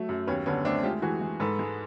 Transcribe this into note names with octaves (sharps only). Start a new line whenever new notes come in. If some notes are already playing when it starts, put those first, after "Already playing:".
Already playing: F#3 A3
F#2
D#2 B3 C#4
D3 B3 C#4
A3 C4 D4
G#3 F4 G4
E3 F#4 G#4
G#3
G#2 A4 B4
G#3